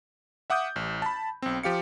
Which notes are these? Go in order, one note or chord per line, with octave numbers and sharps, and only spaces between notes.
E5 F#5 D6 D#6 G6
A1
A5 B5
B1 C4
F3 G4 F5 C#7